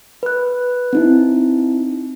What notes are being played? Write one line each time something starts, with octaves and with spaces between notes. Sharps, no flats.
B4 F#6
C4 D#4 E4